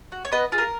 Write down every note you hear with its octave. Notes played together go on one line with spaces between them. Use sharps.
F#4
C#5
B3 B4 D#5
F4 G#4
A#4